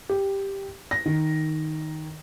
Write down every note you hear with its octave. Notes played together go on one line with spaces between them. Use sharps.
G4
A#6
D#3